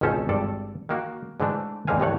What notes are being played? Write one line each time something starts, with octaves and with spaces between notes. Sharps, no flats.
G#1 C#2 B2 C#4 A4 C5
G#1 G2 A4 D5
D#3 A#3 F#4
G#2 D3 E3 A3 D4
E2 G#2 D3 C4 F5 G#5
C2 G2 E3 A3 C#5 F#5